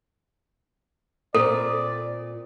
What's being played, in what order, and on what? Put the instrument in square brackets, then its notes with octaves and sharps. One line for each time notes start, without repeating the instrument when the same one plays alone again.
[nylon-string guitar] A#2 C4 [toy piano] A4 [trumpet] D5